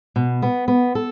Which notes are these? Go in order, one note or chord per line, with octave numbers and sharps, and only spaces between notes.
B2
B3
B3
A4